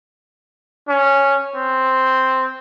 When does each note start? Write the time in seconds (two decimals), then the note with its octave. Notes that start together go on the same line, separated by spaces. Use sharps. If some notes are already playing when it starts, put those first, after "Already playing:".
0.89 C#4
1.56 C4